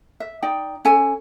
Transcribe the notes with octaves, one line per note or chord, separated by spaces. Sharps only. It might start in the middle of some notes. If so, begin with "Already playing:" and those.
E5
D#4 D5 G5
C#4 A4 G#5